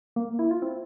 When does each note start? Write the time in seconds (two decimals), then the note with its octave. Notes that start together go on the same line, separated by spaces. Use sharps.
0.16 A#3
0.39 E4
0.51 F4
0.62 C4